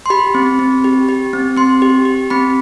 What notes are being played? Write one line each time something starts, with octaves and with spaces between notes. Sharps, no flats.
C6
G4 B5
C4
C4
G4
G4
C4
C4 C6
G4
G4
C4 B5